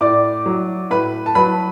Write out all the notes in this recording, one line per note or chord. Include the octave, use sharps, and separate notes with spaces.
A2 D5 D6
F#3
A2 B4 B5
A5
F#3 B4 B5